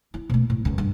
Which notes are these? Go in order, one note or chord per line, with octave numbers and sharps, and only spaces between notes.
E4
B2 A3
A2
C#2 F#2
G2